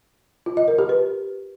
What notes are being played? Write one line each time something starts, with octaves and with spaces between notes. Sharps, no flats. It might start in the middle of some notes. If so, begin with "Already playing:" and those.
F4
D#5
A#4
G4
B4